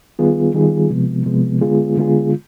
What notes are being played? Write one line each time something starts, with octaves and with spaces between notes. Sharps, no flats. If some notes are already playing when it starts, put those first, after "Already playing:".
D#3 G3 B3 F4 G#4
D#3 G3 B3 F4 G#4
C3 F3 G#3 B3
C3 F3 G#3 B3
D3 G#3 B3 F4 G#4
D3 G#3 B3 F4 G#4